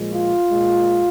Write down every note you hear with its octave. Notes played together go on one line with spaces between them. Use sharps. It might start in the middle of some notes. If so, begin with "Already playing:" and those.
Already playing: A#2 F3 G#3
F4
A#2 G#3